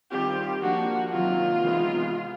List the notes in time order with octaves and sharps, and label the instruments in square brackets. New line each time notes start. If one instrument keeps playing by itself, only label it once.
[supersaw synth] D#3 G3 C4 F4 [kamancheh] G4
[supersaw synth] F3 A#3 D4 [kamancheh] F#4
[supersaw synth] C3 D#3 F#3 A#3 [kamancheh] F4
[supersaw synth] C3 E3 G#3 B3 D#4